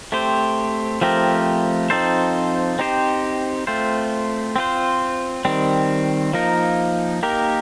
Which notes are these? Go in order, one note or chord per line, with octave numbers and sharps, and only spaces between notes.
A3 C4 G4 C5
F3 A3 C4 G4 A#4
F3 C4 D#4 A4 C5
C4 D#4 G4 C5
A3 C4 F4 C5
C4 F4 C5
D#3 G3 C4
F3 A#3 D#4 A#4
A#3 D#4 G4 A#4